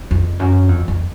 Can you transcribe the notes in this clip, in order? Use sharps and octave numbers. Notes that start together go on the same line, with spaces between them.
F2
F#2
F2
F2